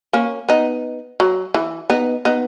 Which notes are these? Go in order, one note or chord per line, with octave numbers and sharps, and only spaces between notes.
A#3 C#4
B3 D#4
F#3
E3
B3 D#4
B3 D#4